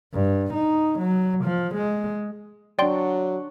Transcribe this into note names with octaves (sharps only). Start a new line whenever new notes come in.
G2
D#4
F#3
F3
G#3
F#3 D4 F#4 D5 G5 C6